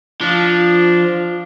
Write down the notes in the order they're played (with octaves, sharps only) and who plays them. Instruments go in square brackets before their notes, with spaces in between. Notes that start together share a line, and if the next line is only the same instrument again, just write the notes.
[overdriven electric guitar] F3 [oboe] D4